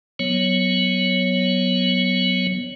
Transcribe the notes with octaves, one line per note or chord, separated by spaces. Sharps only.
F#3 B3 C#5